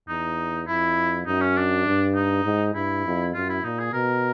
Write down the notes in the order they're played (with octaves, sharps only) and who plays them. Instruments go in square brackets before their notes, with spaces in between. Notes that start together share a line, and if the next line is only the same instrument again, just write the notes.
[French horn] E2 [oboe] D#4
[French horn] F2 [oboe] E4
[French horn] F#2 [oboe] D#4
[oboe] C#4
D4
[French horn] G2
[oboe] D#4
[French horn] G#2
[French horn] G2 [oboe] E4
[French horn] F2
[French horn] F#2 [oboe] F4
[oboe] E4
[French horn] A#2 [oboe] D#4
[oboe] G#4
[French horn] B2 [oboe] A#4